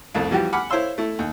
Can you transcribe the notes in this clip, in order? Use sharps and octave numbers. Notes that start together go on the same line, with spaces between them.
C2 F2 A3
E3 F3 G3 F#4 G4
F#5 G#5 B5 D6 F6
E4 C5 C#5 F5 C6 E6
A3 E4
D#2